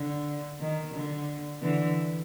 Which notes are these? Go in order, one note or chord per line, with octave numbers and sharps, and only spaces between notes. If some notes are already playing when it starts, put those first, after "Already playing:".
Already playing: D3
D#3
D3
D3 E3